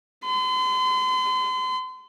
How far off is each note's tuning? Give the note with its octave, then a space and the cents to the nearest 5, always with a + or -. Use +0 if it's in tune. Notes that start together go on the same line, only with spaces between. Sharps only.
C6 -40